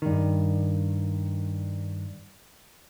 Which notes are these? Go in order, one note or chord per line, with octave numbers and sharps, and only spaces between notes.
G2 D#3